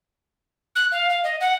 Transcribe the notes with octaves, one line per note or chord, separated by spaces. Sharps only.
F#6
F5
F5
D#5
F#5